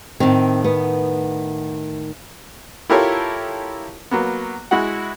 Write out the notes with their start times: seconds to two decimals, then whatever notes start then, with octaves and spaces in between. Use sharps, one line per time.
0.20 A2 D#3 C4
0.64 B3
2.90 E4 F4 G4 A4 A#4 C#5
4.11 F#3 A#3 B3
4.71 G#3 E4 F#4 F#5